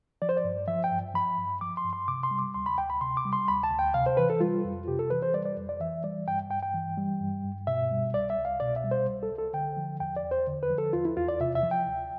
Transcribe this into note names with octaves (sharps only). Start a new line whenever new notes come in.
F3 D5
C5
D5
G2
F3 E5
G5
G2
F3 B5
G2
F3 D6
C6
G2
C6
C3 D6
C6
G3
D6
D2 C6
B5
D2 G5
B5
C3 C6
D6
G3
C6
D2 B5
A5
D2
G5
C3 F5
C5
E3 B4
A4
G3 F4
F2
C3 G4
A4
E3 B4
C5
G3 D5
D5
F2
D5
E3 E5
G3 D5
G2 G5
G2 G5
G5
E3
G3
G2
G2
B2 E5
G3
C2 D5
E5
C2
F5
B2 D5
E5
G3
C5
C2
A4
C2
A4
D3 G5
F3
E2 G5
D5
E2
C5
D3
B4
F3
A4
E2 F4
E4
E2 F4
D5
C3 E5
E5
F3
G5
D2